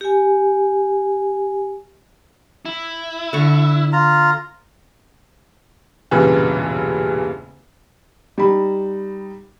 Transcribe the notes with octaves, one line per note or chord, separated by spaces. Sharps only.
G4 G#5
E4
D3 C#6
F4 A#5
E1 G2 A#2 C#3 E3
G3 D#4 B5